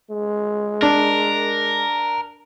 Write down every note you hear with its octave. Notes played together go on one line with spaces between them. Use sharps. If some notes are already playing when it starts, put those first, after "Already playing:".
G#3
D4 A#4